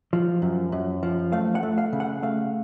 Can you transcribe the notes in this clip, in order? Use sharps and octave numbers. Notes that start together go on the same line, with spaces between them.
F3
F#2
F#2
F3
A3 F5
F#5
A3
F5
C#3
F#5
A3 F5